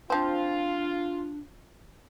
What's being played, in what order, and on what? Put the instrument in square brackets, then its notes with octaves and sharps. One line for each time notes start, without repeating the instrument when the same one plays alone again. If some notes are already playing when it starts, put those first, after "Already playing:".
[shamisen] F3 C4 [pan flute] D4 [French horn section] F4